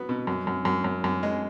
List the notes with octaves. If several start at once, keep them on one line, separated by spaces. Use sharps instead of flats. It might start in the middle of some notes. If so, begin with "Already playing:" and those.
Already playing: F#3 B3
B2
F#2
F#2
F#2
F#2
F#2
G#3